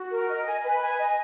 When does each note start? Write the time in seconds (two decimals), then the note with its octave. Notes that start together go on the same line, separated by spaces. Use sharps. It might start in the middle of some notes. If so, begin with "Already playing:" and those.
Already playing: F#4
0.10 A#4
0.28 D#5
0.45 G#5
0.62 B4
0.81 G#5
0.99 D#5